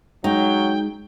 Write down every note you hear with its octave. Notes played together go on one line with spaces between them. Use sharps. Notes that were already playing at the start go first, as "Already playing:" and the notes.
F#3 G#3 D#4 G5